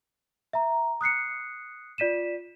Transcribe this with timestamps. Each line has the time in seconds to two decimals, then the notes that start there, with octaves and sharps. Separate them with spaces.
0.53 E5 A#5
1.01 D#6 F#6 C7 C#7
1.98 F4 D5 B6 D#7 E7